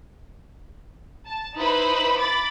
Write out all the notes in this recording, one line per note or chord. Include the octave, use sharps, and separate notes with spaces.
A5
D#4 E4 B4 C5 B5
B5 D6 A6